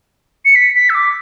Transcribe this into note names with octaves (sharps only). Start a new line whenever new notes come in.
C#7
B6
B6
E6
D6